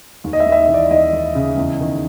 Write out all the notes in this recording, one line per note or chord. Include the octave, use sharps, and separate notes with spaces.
D#2
D#5
E5
D#2
E5
D#5
E3
D5
D#2 D#5
D#2
C#3
E2
D#3